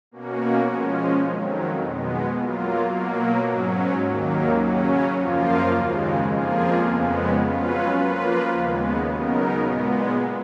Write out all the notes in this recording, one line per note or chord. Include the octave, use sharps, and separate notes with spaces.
B2 A#3 C#4 F#4
F3 G#3 C#4
F2 D#3 F#3
B2 G#3 B3
F#3 A#3 F4
B2 F#3 A#3
G#2 F#3 C#4
D#2 D#3 F#3 A#3
C#3 F#3 C#4
F#2 F3 A#3 F4
D#2 C#3 G#3
F2 F3 A#3 F4 G#4
F2 C#3 G#3 B3
F#3 C#4 F4 B4
F3 A#3 F4 B4
D#2 C#3 G#3 B3
C#3 F#3 B3 D#4 A#4
A#2 G#3 B3